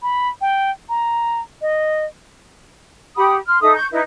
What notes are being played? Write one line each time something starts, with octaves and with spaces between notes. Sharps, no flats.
B5
G5
A#5
D#5
G4 F#5 B5 D#6
C6 F6
D#4 A4 E5 D#6
C#6 G6
D#4 E4 B4